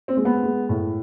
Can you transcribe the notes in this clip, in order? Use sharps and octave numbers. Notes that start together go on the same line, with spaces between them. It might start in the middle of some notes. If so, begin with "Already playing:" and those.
C4
G#3
B3
G#3
A2